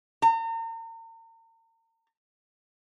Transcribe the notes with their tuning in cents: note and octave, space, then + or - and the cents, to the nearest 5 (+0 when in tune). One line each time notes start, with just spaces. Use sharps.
A#5 -40